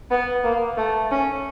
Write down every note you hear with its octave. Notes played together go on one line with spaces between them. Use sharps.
B3
A#3
A3
C#4